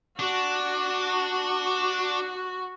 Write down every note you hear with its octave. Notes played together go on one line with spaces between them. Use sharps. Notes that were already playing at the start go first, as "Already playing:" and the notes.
D4 F#4